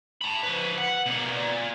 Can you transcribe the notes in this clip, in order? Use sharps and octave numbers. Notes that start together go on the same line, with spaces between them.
A5 B5
F3 B4
F#5
B2 A#3
A#2